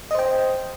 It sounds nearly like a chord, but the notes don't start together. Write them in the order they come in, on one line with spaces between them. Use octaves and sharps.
D#5 C5 G5